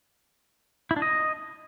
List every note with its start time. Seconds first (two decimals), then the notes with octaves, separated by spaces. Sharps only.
0.91 E4
0.96 D4
1.02 D#5